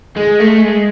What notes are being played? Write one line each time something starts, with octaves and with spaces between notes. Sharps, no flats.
G#3
A3
G#3